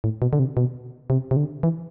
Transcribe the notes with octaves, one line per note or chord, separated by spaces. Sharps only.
A2
B2
D3
C3
B2
C3
C3
D3
E3